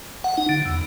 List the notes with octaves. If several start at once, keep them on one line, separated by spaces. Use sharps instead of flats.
F#5
D#4
D3
E2